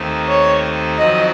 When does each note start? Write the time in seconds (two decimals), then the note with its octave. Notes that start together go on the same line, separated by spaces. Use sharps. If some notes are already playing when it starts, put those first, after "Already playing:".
Already playing: D#2 D#3 A3 C4 D#4
0.28 C#5
0.97 F2 D#3 F#3 C4 F#4 D#5